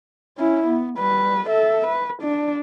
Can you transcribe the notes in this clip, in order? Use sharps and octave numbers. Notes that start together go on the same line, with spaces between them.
C#4 E4
B3
G3 B4
A4 E5
B4
D4